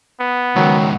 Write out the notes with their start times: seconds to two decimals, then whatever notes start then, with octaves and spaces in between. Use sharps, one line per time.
0.20 B3
0.56 C#2 G#2 D#3 F#3